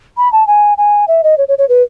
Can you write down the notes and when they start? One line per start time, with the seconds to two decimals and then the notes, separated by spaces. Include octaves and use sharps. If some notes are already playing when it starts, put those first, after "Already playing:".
0.17 B5
0.32 A5
0.47 G#5
0.78 G#5
1.08 E5
1.23 D#5
1.38 C#5
1.48 C#5
1.58 C#5
1.69 B4